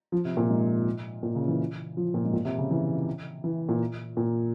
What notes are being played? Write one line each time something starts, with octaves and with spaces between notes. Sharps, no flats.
F3
C3
A#2
G#2
A#2
C#3
E3
F3
A#2
G#2
A#2
C3
C#3
E3
E3
A#2
A#2